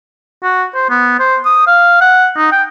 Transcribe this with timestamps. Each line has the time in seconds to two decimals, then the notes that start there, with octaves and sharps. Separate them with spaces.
0.43 F#4
0.75 C5
0.89 B3
1.19 C5
1.45 D#6
1.67 F5
2.01 F#5
2.37 D#4
2.52 G5